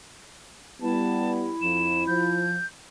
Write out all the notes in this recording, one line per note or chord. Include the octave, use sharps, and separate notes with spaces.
G3 B3 E4 A5
F2 F3 E7
F3 G6